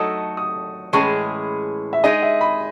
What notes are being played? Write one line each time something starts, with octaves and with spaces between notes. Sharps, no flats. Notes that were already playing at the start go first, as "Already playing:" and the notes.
Already playing: F#3 A3 D#4 F#4 A4 D#6
D#6
A2 E3 G#3 C#4 G#4 C#6
E5
G#3 D#4 G#4 D#5
E5
B5